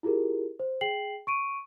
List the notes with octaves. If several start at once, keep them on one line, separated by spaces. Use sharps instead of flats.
E4 F4 G4 G#4 A#4
C5
G#4 G5 C7 F#7
C#6 D7 D#7